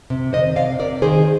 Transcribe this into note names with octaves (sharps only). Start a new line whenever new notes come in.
C3
D#3 C5 D#5
C3 D5 F5
C3 A#4 D5
D#3 G#4 C5